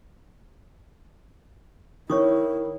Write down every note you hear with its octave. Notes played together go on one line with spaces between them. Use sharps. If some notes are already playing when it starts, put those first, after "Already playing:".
D#3 E4 C#5 C#6 D#6